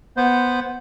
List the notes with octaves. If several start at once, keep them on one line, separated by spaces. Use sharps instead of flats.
B3 C5